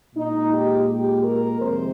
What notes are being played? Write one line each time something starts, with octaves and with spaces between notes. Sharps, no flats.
A#2 G#3 D#4
G4
G4
A#4
F2 C3 D#3 G#3 C5